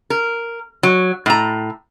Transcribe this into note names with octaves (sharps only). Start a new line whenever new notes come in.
A#4
F#3
A2 A#5